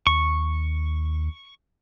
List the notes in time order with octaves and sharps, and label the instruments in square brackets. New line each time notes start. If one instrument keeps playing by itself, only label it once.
[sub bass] D#2 [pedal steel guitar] C#6